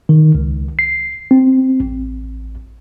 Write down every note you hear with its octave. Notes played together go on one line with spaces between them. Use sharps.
D#3
C#2
C7
C4
A1